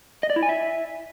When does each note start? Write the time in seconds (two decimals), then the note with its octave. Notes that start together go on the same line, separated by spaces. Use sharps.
0.23 D#5
0.30 D5
0.36 E4
0.43 G#5
0.49 E5